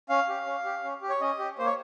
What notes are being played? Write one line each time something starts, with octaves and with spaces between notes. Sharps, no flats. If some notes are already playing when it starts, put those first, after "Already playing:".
C#4 F5
G4
C#4
G4
C#4
G4
C#5
C#4 D#5
G4
A#3 C5
C#5